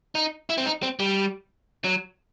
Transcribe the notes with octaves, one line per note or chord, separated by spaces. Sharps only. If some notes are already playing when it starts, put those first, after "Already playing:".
D#4
E4
C4
D#4
C4
G3
F#3